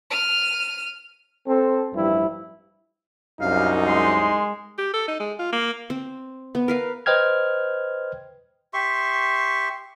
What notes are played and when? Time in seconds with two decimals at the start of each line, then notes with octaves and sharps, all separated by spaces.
0.11 F6 D#7
1.48 C4 A4
1.94 A1 G2 F3 G3 E4
3.41 C2 F#2 D#4 F5
3.88 G#3 C6
4.78 G4
4.94 A4
5.08 D#4
5.20 G#3
5.39 F4
5.52 A#3
5.90 C4
6.55 B3
6.68 A#4 B4 F5
7.06 B4 C5 D#5 G5 F6 G#6
8.74 G4 E5 C6 C#6